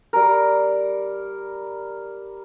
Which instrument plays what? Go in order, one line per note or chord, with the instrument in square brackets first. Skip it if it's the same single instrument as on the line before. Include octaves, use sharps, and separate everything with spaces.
[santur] G3 A#4